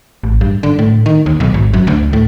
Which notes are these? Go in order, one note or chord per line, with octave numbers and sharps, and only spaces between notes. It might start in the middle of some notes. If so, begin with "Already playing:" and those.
A1
G2
D3
A2
D#3
D#2
B1
G#1
F#2
D2
A2